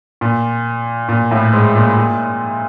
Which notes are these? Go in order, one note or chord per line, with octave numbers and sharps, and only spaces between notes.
A#2
A#2
A2
G#2
A#2
A#2